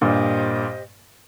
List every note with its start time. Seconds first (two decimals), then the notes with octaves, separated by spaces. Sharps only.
0.01 G2 A#2 G4 C5 D#5